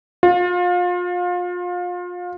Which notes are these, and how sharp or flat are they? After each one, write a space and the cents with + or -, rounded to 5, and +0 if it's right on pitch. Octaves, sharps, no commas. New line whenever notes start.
F4 +30